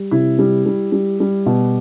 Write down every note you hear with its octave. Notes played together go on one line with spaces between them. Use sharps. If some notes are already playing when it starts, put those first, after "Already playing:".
Already playing: G3
C3 E4
G3
G3
G3
G3
B2